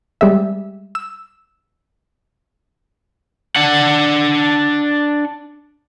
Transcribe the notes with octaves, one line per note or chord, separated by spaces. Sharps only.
G3 G#3 E5
E6
D4 F#5